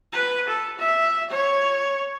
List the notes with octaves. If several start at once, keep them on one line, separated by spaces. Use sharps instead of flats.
B4
A4
E5
C#5